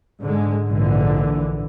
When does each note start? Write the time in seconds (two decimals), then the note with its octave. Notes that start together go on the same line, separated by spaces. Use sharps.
0.24 G#2 D3 G#3
0.69 A#1 G#2 D3 E3